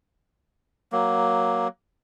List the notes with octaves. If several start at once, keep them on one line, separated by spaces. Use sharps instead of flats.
F#3 A#3